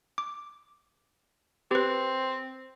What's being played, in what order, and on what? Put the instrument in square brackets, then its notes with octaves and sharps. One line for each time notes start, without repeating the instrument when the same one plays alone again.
[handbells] D6
[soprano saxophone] C4 [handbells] G4 B4